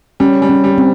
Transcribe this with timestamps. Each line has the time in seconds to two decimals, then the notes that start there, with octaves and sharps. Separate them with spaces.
0.20 G3 C#4
0.42 G3
0.49 C#4
0.64 G3
0.78 C4